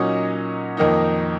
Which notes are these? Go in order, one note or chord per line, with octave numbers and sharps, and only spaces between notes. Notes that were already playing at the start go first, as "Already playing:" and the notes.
Already playing: A#2 F#3 C#4 D#4 D#5
F2 D#3 A#3 D#4